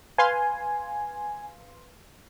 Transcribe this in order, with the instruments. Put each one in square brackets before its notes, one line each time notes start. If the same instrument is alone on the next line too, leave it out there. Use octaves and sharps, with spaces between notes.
[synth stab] B4 F5 C6 [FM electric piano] G#5